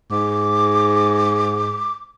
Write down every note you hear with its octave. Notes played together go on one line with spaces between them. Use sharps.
G#2 D6